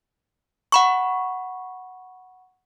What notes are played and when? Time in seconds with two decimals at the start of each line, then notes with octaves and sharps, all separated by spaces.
0.72 F#5 B5 C#6